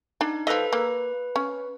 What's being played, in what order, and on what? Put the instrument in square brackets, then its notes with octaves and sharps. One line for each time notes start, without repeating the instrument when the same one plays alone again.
[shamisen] D4 [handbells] D#4
[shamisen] F3 D#5 [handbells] A4 B4
[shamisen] A#3 [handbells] B4
[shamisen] C#4